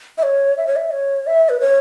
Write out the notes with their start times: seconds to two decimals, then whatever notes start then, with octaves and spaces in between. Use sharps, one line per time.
0.18 E5
0.23 C#5
0.58 E5
0.67 C#5
0.76 E5
0.92 C#5
1.27 E5
1.49 B4
1.60 C#5